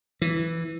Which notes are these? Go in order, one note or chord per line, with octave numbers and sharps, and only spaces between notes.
E3